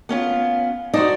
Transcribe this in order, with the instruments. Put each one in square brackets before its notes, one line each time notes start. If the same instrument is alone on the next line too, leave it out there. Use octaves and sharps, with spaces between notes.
[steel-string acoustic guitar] B3 C#4 F4
[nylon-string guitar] D#4 [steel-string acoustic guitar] F#4 C5 D5